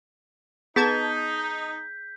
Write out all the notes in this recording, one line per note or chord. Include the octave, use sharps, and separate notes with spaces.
B3 D#4 G#4 A5 G6 G#6 B6